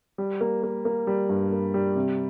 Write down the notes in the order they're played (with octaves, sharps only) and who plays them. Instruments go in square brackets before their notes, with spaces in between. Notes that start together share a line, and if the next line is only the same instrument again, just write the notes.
[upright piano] G3
A#3
A#3
A#3
G3
G2
A#3
G3
C3